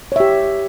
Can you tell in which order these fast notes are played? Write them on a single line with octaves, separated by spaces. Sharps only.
C#5 E5 G4